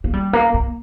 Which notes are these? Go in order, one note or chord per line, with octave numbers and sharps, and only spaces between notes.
A#3
G3
A#3
A#3